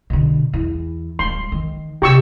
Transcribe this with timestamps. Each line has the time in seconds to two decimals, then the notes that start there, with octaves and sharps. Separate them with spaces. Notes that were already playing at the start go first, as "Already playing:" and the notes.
0.10 B2 D3
0.53 E2
1.19 D1 G3 C6
1.52 D#3
2.02 C3 G4 C#6 E6